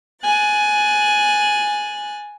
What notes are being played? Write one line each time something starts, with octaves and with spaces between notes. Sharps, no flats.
G#5 F#6 A6